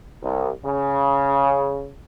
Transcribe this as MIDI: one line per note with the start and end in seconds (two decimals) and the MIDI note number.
0.22 0.49 36
0.64 1.90 49